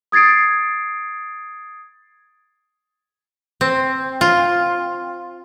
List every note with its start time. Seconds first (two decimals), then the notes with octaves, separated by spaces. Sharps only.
0.12 D#6 G#6 A6 C7 D7
3.61 C4
4.21 F4